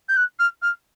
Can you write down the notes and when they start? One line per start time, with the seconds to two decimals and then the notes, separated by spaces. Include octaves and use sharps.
0.09 G6
0.17 F#6
0.39 F6
0.62 F6